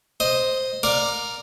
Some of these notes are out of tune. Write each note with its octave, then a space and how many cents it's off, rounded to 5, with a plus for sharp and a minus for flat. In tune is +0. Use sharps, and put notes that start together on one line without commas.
C5 +0 D#5 +0
A#4 +0 D5 +0 F5 +40